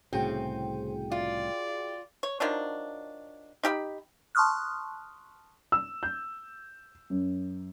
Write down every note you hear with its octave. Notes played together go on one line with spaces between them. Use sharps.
C2 A2 C#3 C4 F#4 G#4 G5
F4 D5
C#5
D#3 F3 F#3 D4
D#4 G4 F5 B5
A5 C6 C#6 D#6 F6 F#6
E6
G6
F#2